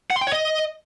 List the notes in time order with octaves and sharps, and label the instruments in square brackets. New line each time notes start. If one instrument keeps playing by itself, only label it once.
[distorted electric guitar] F#5
C6
G5
C#5
D#5